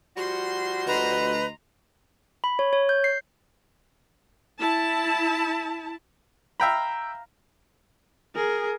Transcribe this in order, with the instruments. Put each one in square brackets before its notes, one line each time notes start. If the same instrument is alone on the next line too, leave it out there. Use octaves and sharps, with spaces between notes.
[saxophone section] F3 G3 F#4 [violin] C6
[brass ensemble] D2 D#5 [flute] B4 [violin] A#5 C6
[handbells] B5
C#5
C#5
G6
C7
[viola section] E4 A5
[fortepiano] E5 G5 B5 [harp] F5 A#5
[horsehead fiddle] G#4 [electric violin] A#4